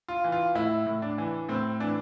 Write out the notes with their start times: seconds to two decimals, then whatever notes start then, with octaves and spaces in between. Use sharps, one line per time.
0.08 F4
0.24 E3
0.32 F4
0.55 A2 E4
0.87 A2
1.02 D4
1.18 E3
1.49 A2 C4
1.80 E3 D4